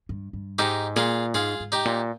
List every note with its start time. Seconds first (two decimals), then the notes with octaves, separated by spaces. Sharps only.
0.09 G2
0.33 G2
0.58 G#2 D#4 G4
0.96 A#2 F4 G#4
1.34 G#2 F4 G#4
1.60 G#2
1.72 D#4 G4
1.85 A#2